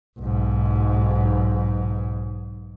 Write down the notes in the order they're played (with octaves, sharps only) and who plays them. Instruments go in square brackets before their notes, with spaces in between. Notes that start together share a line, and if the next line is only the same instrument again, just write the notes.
[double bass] B1 G#2